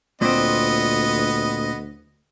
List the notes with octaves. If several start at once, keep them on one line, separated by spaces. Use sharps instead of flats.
D2 A#2 B3 C4 D#5